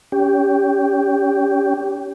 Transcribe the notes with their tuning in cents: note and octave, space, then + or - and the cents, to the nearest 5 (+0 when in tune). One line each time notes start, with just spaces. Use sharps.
C#4 +30 G4 +0